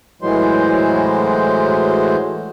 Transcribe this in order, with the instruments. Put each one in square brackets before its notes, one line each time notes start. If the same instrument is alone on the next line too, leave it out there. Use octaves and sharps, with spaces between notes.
[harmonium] A2 E3 F#3 G#3 C5